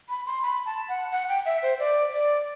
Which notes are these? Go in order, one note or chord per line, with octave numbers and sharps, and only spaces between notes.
B5
C6
B5
A5
F#5
F#5
G5
E5
C5
D5
D5